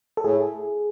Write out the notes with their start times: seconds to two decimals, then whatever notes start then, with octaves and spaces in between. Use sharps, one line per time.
0.17 A4
0.24 A2 G#4